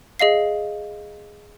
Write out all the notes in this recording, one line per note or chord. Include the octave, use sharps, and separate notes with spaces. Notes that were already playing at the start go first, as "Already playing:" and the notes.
G#4 D#5 F5 C7